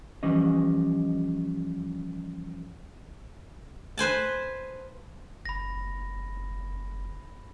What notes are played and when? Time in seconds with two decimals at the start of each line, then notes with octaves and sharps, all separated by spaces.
0.23 E3 F3 G3 C#4 D#5
3.98 B4 C5 G#5 A5
5.45 F#1 B5 A#6